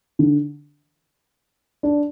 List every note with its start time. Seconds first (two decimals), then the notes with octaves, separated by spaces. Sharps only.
0.19 D3
1.83 D4